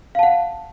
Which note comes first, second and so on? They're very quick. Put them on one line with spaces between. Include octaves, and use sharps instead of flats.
F5 A5 F#5